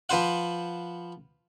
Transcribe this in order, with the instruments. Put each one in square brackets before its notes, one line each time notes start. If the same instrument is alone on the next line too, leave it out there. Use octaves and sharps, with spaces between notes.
[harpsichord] F3 B4 C5 F#5